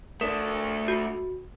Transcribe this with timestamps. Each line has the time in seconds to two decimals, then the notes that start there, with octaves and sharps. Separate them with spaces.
0.21 A3 D4 A#4
0.88 F#4